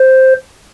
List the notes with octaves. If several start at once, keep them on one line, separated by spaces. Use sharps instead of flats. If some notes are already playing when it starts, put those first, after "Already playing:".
Already playing: C5